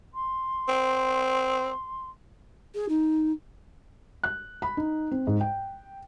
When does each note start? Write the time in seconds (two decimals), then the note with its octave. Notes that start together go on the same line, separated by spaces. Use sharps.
0.14 C6
0.68 C4
2.75 G#4
2.89 D#4
4.24 F#6
4.62 B5
4.77 D#4
5.11 C4
5.27 G#2
5.41 G5